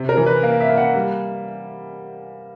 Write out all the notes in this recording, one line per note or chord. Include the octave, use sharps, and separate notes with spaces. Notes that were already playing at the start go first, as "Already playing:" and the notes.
Already playing: C3
A#4
E3
B4
A#3
E5
A#3
F#5
G3